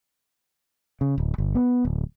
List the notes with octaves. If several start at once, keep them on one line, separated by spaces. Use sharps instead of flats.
C#3
D1
G1
B3
D1